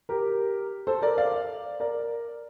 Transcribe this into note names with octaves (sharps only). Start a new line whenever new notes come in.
G4 A#4
A4 C5
A#4 D5
D5 F5
A#4 D5